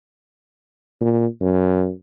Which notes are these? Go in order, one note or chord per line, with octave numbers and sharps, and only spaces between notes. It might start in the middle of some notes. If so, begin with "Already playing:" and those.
A#2
F#2